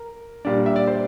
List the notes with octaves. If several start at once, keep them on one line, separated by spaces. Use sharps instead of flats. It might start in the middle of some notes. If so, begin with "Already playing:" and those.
Already playing: A#4
A#2 G3 D4
E5
D5
C5